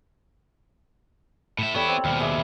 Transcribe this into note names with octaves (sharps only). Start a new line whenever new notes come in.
A2 E5
G3 B3 E4 A4 C#5
C4 D5
D#2 B2 F5
G#4 E5 D6